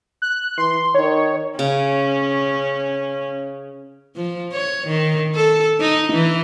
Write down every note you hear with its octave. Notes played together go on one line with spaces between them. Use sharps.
F#6
E3 C6
D#3 C#5
C#3 C#4
F3
C#5
D#3
A4
D#4
E3